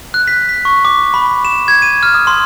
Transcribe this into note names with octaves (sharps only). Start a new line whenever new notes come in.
F#6
B6
B6
C#6
D6
B5
E7
G#6
D#7
F6
D#6
C6